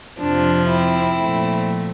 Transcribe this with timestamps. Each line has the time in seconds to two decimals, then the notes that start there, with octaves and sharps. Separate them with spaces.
0.20 F2 C3 F3 D4
0.71 C4 E4
1.21 A#2 F3 A3